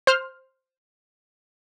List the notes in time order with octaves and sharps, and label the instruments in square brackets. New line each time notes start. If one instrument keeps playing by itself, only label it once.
[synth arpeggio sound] C5 F6